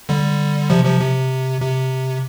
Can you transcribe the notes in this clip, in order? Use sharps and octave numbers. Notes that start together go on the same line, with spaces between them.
D3 G3
C3 F3
C3 F3
C3
C3